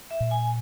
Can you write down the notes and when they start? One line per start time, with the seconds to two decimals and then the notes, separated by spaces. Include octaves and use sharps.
0.11 E5
0.20 A#2
0.31 G#5